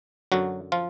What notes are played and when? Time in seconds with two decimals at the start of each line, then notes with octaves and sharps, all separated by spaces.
0.32 F#2 D3 F#3 F#4
0.72 F3 F4